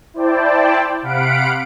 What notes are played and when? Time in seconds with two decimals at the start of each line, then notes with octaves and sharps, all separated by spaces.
0.14 E4 C5 D5 G5 A5
1.02 C3 F5 F#5 B5 D7